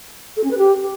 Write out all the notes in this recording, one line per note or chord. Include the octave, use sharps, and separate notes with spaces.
A4
C#4
B4
G4